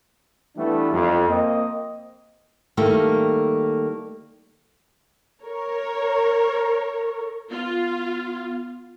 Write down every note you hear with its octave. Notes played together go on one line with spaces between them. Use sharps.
E3 G3 A3 B3 D4
F2
A#3 C4 D#5
D#3 G3 A3 A#3 A4
A#4 C#5
B3 F4